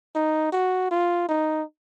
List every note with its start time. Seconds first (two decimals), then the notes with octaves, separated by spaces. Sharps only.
0.15 D#4
0.53 F#4
0.91 F4
1.29 D#4